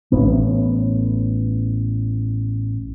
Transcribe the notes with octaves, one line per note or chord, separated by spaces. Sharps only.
A1 A2 B3